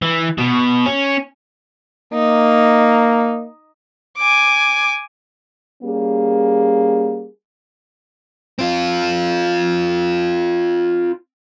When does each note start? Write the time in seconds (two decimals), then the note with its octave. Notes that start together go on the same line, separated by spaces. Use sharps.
0.02 E3
0.38 B2
0.86 C#4
2.14 A#3 D#4
4.19 G#5 D6
5.83 G3 A#3 C#4 G#4
8.59 C4 F4